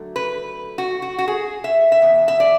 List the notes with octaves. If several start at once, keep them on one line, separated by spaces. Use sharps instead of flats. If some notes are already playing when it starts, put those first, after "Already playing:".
Already playing: D3 F#3 A3
B4
F#4
F#4
F#4
G#4
E5
E5
E2 B2
E5
D5